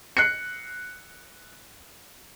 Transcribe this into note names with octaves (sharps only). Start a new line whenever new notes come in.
F#6 C7 C#7